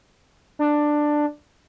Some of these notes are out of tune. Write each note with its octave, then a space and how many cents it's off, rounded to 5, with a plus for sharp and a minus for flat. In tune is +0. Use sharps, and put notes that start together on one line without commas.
D4 +10